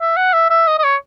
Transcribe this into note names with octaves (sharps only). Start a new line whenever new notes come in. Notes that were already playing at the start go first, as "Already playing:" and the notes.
E5
F#5
E5
E5
D#5
D#5
C#5